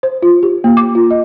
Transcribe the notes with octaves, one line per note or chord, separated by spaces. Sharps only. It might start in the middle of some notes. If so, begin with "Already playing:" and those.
C5
F4
G4
A#3
D6
F4
D#5